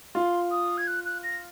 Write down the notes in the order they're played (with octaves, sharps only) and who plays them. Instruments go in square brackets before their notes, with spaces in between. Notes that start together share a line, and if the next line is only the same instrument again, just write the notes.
[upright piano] F4 [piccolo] C6
[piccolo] D#6
G#6
F#6
F#6
A#6